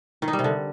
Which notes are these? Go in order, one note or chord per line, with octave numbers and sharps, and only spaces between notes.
D#3
D#4
G3
C3
D3